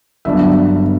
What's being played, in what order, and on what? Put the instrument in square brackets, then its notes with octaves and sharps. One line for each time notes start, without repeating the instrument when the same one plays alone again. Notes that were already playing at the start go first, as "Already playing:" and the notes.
[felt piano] G1 G2 F#3 B3 D4 E5